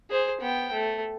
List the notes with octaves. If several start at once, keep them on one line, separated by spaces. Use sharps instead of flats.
G#4 C5
B3 G5
A3